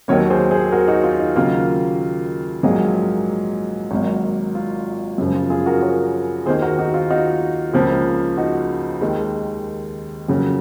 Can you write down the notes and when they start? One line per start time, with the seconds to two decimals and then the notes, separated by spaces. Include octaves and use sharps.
0.08 D#2 D#3 F#3 A#3 A#4 C#5
0.30 G#4 C5
0.51 G#4 C5
0.72 F#4 A#4
0.88 D#4 F#4
1.04 F4
1.20 D#4
1.36 D#2 C#3 F#3 A#3 F4
2.63 A#1 G#2 F#3 A#3 F4 G#4
3.91 G#1 G#2 F#3 A#3
4.55 F4
5.18 F#2 C#3 F3
5.35 F4
5.50 F4 G#4
5.66 F#4 A#4
5.82 A#4 C#5
6.46 D#2 D#3 A#3 G#4 C5
6.62 F#4 A#4
6.79 D#4 F#4
6.94 F4
7.11 D#4 F#4
7.73 C#2 C#3 F3 A#3
8.37 D#4 F#4
9.01 D#2 D#3 G#3
10.28 F2 C#3 F#3 A#3